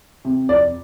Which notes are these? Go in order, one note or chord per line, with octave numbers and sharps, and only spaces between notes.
C3
F2 D5